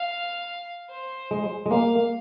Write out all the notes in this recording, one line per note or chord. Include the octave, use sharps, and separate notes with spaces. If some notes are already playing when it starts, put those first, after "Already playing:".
Already playing: F5
C5
G#3
G#3
A#3 F5